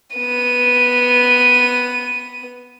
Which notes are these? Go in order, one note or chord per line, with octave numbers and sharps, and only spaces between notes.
B3 D#7